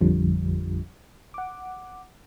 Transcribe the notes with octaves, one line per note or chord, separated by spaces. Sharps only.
A1 F2 D3 F3 G3
F#5 D6